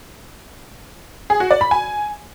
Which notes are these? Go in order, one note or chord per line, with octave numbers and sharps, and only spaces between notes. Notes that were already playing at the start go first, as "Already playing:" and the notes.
G#4
F#4
D5
B5
G#5